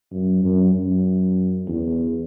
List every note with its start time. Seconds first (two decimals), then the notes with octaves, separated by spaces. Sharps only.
0.12 F#2
0.44 F#2
0.75 F#2
1.68 E2